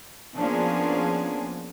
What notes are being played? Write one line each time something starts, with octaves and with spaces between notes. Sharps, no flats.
F3 A#3 B3 C#4 D4 G#4